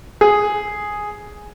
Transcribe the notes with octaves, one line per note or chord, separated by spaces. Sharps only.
G#4